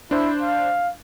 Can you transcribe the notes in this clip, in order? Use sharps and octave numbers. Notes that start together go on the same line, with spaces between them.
D4 E4 C5
F5